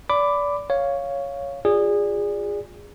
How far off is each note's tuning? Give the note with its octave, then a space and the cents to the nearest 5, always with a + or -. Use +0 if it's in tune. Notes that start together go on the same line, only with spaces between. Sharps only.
D5 -25 B5 +15 D6 +0
C#5 +5 F5 +0
F4 +25 G#4 -20 D5 +0